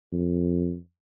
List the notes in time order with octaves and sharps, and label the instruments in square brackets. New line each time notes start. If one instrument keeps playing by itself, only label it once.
[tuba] F2